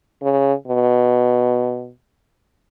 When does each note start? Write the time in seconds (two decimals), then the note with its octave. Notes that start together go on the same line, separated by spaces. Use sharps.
0.23 C#3
0.67 B2